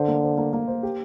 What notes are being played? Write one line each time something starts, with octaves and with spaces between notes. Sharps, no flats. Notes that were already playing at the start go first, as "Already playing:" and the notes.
Already playing: D3 C5
A#3
C5
A#3
A#3
C5
G4